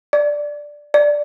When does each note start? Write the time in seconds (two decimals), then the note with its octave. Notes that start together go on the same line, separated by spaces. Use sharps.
0.13 D5
0.94 D5